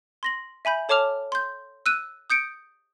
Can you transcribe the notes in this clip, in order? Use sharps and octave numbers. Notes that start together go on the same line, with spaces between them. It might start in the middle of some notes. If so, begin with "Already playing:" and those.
C6 A#6 F#7
E5 G#5 B5 G6
A4 C#5 A5 D6 F6 F7
C6 G6
E6 F#6 D#7
D#6 G6 C#7 D7